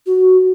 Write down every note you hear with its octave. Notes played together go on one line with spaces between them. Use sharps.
F#4